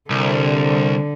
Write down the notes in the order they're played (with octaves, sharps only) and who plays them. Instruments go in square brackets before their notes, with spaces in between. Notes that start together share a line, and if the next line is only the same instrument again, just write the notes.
[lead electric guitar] C2 [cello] D3